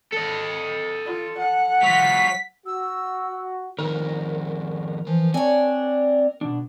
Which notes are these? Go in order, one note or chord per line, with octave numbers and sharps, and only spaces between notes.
A4 D#5
F4
F#5
F#3 F4 B6
F#4 E6
F2 D#3 A#4
E3 F3
C4 D4 C#5 G#5
B2 D4